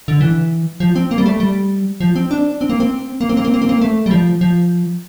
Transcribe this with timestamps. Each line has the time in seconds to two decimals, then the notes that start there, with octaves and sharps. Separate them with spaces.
0.08 D3
0.21 E3
0.80 F3
0.96 C4
1.11 A#3
1.18 G3
1.26 A3
1.40 G3
2.00 F3
2.16 C4
2.31 D4
2.61 C4
2.70 A#3
2.80 C4
3.21 A#3
3.29 C4
3.37 A#3
3.45 C4
3.54 A#3
3.62 C4
3.69 A#3
3.81 A3
4.06 G3
4.11 F3
4.41 F3